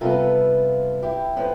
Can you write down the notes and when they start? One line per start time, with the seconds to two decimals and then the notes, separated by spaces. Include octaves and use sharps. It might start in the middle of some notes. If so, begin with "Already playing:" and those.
0.01 C3 G3 B3 F4 A4
1.03 E4 G4
1.36 A2 F3 B3